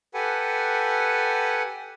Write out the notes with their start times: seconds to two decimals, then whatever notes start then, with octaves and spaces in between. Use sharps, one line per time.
0.14 G4 A4 B4 F#5 G#5